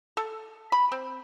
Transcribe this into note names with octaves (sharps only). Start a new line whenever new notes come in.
A4
B5
C4